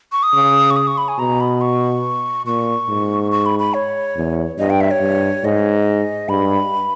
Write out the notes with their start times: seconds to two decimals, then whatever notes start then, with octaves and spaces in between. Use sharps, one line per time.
0.12 C#6
0.23 D#6
0.34 C#3
0.71 C#6
0.76 D#6
0.87 C#6
0.98 B5
1.08 G#5
1.19 B2 A#5
1.40 B5
1.61 C#6
2.46 A#2 C#6
2.89 G#2
3.32 C#6
3.46 B5
3.59 B5
3.74 C#5
4.16 E2
4.59 G2 D#5
4.70 G5
4.81 E5
4.91 C#5
5.01 G2
5.44 G#2 D#5
6.29 G2 B5